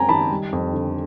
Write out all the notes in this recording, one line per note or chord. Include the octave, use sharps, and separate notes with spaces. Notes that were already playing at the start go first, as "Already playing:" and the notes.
Already playing: F#2 G#3 C4 G5 G#5 A#5
D#3 A5 B5
G3
F2
D3